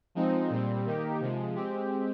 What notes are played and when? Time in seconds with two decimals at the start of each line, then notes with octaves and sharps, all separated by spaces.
0.15 F3 G#3 C4 D#4
0.50 A#2 G3 C4
0.85 D#3 A#3 D#4 G4
1.20 C3 F3 G#3
1.55 G#3 C4 G4